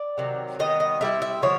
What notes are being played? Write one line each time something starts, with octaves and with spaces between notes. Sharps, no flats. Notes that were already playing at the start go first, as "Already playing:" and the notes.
Already playing: D5
C3 D#3 F#3
D#3 G3 B3 D#5
D#5
D3 G3 C4 E4 E5
E5
D3 F3 C#5